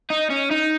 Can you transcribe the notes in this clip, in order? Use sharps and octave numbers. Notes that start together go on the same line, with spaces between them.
D#4
C#4
D#4